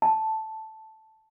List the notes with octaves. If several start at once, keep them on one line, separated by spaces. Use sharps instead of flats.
A5